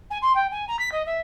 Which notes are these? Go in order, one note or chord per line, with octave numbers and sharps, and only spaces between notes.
G#5
C6
G5
G#5
A#5
B6
D#5
E5